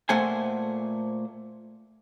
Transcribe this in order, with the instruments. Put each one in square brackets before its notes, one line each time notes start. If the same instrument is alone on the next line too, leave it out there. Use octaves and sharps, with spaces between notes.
[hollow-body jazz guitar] A#2 A3 C5 F#5 G#5